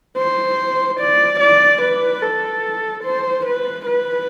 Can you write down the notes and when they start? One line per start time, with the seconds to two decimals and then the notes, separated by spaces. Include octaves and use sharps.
0.17 C5
1.00 D5
1.40 D5
1.82 B4
2.22 A4
3.05 C5
3.46 B4
3.86 B4